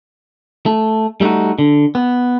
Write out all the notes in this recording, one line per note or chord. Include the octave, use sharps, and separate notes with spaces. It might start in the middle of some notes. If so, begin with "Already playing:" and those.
A3
G3 A3 C#4 D#4 F#4
D3
B3